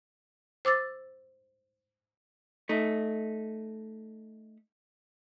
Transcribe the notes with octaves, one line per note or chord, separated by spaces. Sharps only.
C5 D6 E6 A6
A3 D#4